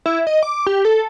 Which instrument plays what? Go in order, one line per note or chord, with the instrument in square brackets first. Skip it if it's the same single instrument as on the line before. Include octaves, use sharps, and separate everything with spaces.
[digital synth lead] E4
D#5
D6
G4
A4